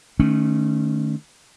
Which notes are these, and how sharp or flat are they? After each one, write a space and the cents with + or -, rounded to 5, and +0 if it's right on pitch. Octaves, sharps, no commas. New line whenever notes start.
D#3 -30 A3 +0 C#4 +0